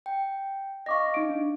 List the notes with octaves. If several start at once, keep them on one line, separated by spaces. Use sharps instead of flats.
G5
D#5 F5 C#6 D6 A#6
D#4 D7
D4